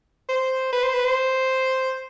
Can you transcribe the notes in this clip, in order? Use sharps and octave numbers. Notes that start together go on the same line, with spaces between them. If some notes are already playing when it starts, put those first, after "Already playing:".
C5
B4
C5
B4
C5